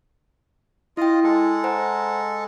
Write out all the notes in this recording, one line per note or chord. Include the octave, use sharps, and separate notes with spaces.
E4 F4 D#5 G5
G#3 A4
C5 F#5 A#5